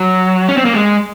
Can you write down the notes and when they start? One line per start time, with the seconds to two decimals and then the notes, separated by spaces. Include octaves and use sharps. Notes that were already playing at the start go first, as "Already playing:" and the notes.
Already playing: F#3
0.48 C#4
0.57 C4
0.65 A#3
0.73 G#3